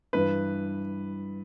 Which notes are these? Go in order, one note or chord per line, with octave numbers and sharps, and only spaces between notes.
G2 E3 B4